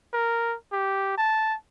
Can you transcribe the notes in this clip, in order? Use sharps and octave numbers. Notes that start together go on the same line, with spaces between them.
A#4
G4
A5